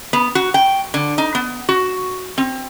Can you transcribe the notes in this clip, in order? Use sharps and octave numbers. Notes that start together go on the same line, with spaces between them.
B3
F#4
G5
D3
D#4
B3
F#4
C4